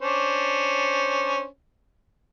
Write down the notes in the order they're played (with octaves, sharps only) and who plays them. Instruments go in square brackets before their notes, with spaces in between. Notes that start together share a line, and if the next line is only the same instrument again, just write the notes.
[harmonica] C#4 D4 C5